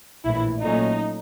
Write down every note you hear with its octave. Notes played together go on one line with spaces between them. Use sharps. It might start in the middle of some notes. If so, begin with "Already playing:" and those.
A#1 A2 E3 E4
A#2 F#3 A3 C#4 D#4